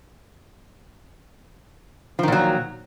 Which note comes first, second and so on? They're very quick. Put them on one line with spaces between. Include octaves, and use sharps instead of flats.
F3 D#3 A#2 F#3